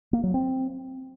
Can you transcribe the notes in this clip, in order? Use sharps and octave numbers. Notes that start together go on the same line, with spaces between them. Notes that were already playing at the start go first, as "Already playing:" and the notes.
A#3
F#3
C4